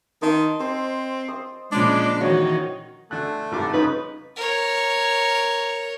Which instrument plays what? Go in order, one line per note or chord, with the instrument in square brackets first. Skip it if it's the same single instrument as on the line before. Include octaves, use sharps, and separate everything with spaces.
[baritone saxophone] D#3 [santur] D#5 A5 C6
[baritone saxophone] C4 [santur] C5
[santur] D#6
[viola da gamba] A#2 C#3 F3 [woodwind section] G#3 D6 [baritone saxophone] D4
[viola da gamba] D#3 E3 [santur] F#4 [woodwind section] C#5
[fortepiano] D3 F#6 [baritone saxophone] A3
[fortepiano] G#1 G2 D6
[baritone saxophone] F2 [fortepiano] C#3 [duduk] D#4 [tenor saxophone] B4
[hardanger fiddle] A#4 C#5